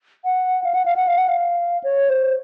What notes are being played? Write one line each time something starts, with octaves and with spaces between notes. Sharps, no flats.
F#5
F5
F#5
F5
F#5
F5
F#5
F5
C#5
C5